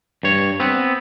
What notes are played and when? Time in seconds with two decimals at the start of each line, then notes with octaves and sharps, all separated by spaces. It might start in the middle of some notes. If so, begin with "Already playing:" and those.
0.23 G2 C#5
0.60 B3 C4